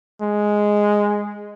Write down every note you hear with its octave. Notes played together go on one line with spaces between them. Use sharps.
G#3